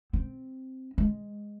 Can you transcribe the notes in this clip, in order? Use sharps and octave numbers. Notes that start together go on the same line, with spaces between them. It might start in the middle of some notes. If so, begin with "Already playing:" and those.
C4
G#3